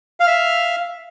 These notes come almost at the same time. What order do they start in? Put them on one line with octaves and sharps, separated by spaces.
F5 F6 E5